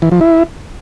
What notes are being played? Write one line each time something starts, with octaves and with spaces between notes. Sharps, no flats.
E3
F3
E4